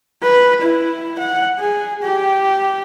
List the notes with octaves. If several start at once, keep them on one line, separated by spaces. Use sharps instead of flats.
B4
E4
F#5
G#4
G4